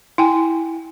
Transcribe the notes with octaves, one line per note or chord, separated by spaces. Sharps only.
E4 G5 G#5